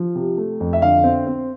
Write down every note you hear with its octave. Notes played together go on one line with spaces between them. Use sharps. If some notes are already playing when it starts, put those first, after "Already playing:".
Already playing: F3
C3
A3
F2
E5
D3 F5
C4
C4